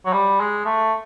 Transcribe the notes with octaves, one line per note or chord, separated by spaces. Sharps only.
F#3
G3
G#3
A3